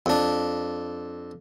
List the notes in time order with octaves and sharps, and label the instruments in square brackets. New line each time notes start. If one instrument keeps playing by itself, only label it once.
[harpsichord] F2 D4